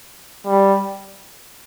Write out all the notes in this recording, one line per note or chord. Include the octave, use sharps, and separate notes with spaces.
G3